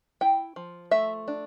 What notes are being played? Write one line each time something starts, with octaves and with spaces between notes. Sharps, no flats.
E4 G5
F3
A3 E5
D4